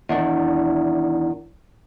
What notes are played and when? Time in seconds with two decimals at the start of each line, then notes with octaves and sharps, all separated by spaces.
0.09 E2 D#3 D4